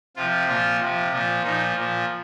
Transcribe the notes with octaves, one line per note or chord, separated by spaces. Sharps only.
C3 F3 F4
A#2 F3 F4
C3 F3
A#2 F3
A#2 F3 D#4
A#2 F3